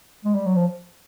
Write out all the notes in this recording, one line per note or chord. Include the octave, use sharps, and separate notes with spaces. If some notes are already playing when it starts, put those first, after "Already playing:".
G#3
G3
F#3
F3